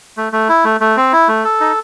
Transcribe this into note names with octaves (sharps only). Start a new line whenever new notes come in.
A3
A3
E4
A3
A3
C4
E4
A3
A4
D#4